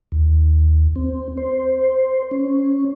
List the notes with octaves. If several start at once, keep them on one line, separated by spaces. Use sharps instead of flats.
D#2
C4
C5
C#4